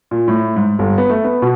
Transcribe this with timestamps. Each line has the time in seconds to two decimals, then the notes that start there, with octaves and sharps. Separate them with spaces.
0.11 A#2
0.28 A2
0.56 G#2
0.79 G1
0.98 B3
1.10 A3
1.24 B3
1.42 B2